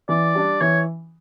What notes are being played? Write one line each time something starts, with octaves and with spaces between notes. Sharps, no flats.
E3 D5
G3 D4
E3 C#5